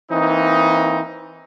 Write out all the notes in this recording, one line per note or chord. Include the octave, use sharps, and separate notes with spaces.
E3 A#3 C4 D#4